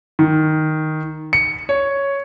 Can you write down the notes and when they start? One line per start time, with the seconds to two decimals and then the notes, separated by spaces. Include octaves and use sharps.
0.19 D#3
1.33 C#7
1.69 C#5